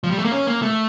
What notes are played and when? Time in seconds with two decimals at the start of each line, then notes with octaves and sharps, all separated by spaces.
0.04 F3
0.11 G3
0.18 A3
0.25 A#3
0.32 C#4
0.47 A#3
0.62 A3